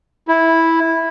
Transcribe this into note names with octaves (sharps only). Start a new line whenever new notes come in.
E4